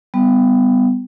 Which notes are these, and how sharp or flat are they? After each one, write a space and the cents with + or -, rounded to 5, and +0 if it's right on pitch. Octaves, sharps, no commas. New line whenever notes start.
G3 +0 B3 +15